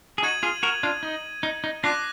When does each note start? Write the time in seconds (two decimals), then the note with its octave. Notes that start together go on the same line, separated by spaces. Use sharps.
0.18 G#4
0.22 D#4 F#4 D#6 G#6 D#7 F#7
0.43 F4 G#4
0.63 F#4 A#4
0.83 D4 F4
1.03 D#4
1.43 D#4
1.64 D#4
1.83 D4 F4 D6 F#6 A#6